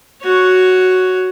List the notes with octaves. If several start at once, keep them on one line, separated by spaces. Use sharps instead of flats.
F#4 C#5